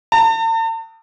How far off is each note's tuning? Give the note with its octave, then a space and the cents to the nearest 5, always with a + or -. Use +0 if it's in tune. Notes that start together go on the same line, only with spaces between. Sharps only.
A5 +45